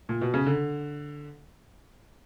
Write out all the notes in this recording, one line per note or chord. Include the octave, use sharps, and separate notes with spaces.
A#2
B2
C#3
D3